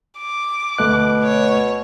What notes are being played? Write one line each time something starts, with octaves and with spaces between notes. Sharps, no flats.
D6
D2 B2 A3 F#6
C#5